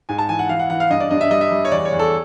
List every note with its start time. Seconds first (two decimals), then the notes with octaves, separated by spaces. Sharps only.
0.09 G#2 G#5
0.18 A5
0.29 E3 G#5
0.39 F#5
0.49 E3 F5
0.59 F#5
0.70 E3 F#5
0.80 F5
0.90 G2 D#5
1.00 D5
1.11 G2 D#5
1.21 E5
1.31 G3 D#5
1.41 E5
1.51 G3
1.65 C#5
1.71 E2 D5
1.85 C#5
1.92 E2
1.99 A4